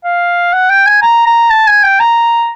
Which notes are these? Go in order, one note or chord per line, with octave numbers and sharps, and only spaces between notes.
F5
F#5
G5
G#5
A#5
A#5
A5
G#5
G5
A#5